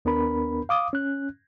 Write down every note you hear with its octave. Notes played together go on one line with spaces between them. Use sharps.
D#2 B3 D4 A#4 B5
F5 D6 D#6
C#4 F#6